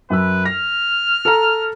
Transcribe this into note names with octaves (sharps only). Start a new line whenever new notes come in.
F#2 B4 E6
F6 A#6
A4 A#5